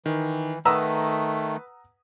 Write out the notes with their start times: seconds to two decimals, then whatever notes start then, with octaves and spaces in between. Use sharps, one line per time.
0.06 D#3 E3
0.65 D#3 A3 B4 F#5 A#5 D#6 E6